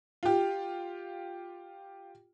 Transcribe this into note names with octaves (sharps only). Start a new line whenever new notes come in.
F4 G4